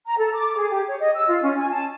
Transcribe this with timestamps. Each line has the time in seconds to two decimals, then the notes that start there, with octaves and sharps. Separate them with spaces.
0.06 A#5
0.18 A4
0.34 D6
0.56 G#4
0.71 G4
0.87 C#5
0.99 D#5
1.15 E6
1.28 F4
1.43 C#4
1.58 G#5
1.71 A5